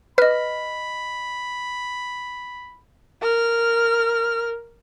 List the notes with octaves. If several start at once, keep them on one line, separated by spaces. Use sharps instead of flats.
B4 D#5 B5 F6
A#4 F6